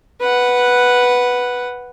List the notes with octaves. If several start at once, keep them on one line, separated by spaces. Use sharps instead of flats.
B4 F#5